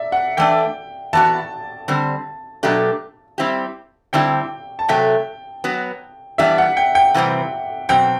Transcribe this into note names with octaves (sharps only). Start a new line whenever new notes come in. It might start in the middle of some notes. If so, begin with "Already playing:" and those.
Already playing: D5 E5
F#5
E3 A3 D4 G5
E3 B3 F#4 A5
D3 G3 C4
B2 F#3 A3 D4 G4
G3 C4 E4 G4
D3 G3 C4 E4 G4 G5
A5
C3 F#3 A3 G5
F#3 B3 F#4
E3 G3 B3 D4 E5
F#5
G5
G5
C3 E3 G3 C4
B2 F#3 C4 G5